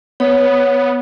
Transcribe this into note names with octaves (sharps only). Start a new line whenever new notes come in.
B3 C#5